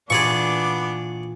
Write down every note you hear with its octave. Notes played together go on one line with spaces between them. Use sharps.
A#2 E3 B3 D4 G#4 D5 C#6 D6